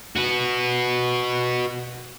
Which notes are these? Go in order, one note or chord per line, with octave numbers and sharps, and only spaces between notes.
F#4 B4